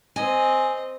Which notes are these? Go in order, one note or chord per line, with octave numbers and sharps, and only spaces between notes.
C4 D#5 G#5